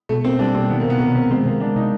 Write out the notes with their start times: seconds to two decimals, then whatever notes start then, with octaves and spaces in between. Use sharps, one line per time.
0.09 B2 A3
0.24 A#3 C4
0.39 G3 D4
0.55 B2 C4
0.70 D#3 B3
0.80 A#3
0.84 C3
0.90 B3
1.00 C3 A#3
1.15 C3 C4
1.31 G#3 C4
1.45 C3 A#3
1.60 G#3 D4
1.76 C3 D#4